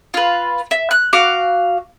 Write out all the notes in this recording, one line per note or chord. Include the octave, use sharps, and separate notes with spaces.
F4 B4
E5
F#6
F#4 F5 D6